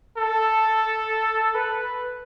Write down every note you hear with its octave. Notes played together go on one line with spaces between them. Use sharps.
A4
B4